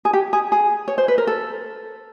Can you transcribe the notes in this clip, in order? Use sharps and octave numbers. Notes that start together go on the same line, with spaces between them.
G#4
G4
G#4
G#4
C#5
C5
B4
A#4
A4